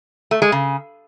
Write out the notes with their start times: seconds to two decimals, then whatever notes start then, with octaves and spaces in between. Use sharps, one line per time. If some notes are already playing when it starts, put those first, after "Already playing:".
0.31 A3
0.42 G#3
0.52 C#3